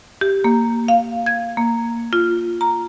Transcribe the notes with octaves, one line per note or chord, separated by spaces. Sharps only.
G4
A#3
F5
G#6
A#3
F4
A#5